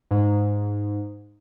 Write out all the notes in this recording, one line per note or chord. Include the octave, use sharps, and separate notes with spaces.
G#2